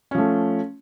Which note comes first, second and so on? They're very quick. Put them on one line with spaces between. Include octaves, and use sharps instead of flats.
C#4 F3 A3